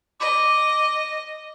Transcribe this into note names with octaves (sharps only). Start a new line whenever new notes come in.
D#5 D6